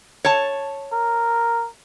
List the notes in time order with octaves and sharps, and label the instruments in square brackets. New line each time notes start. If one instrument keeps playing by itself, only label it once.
[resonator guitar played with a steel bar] C#5 A5
[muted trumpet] A#4